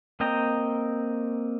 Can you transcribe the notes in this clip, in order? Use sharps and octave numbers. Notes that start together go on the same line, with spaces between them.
A#3 C4 D#5 G5 A#5